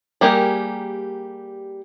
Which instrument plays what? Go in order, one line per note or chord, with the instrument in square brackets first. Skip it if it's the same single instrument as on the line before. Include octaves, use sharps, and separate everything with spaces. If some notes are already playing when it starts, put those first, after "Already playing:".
[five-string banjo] G3 A#3 G4 G#4 A#4